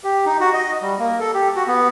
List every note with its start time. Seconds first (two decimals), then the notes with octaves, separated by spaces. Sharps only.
0.04 G4
0.26 D#4
0.40 F#4
0.53 D#5
0.81 G3
0.99 A#3
1.20 A4
1.34 G4
1.56 F#4
1.67 B3